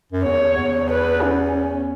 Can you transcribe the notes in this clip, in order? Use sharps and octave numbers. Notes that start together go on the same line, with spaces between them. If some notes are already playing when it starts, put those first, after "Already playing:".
F#2
E2 C#5
E2
B4
C#4